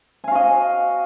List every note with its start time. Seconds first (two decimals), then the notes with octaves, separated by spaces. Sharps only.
0.24 G#5
0.28 F5
0.31 F#4
0.35 D#5